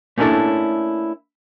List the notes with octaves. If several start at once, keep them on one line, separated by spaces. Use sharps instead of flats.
A3 A#3 C#4 D4 E4 A4